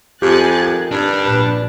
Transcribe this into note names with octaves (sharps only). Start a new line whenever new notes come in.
F2 G4 G#5 F#6 A6
D#3 G#6
G2 D4
A#1 B4